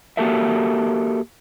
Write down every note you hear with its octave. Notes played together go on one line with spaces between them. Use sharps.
A#3 F#4 G4 A4 A#4 E5